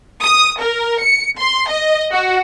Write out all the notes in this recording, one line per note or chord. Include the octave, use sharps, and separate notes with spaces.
D#6
A#4
C#7
C6
D#5
F#4